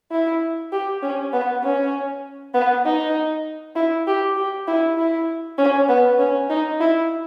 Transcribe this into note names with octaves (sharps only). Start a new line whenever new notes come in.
E4
G4
C#4
B3
C#4
B3
D#4
E4
G4
G4
E4
E4
C#4
B3
C#4
D#4
E4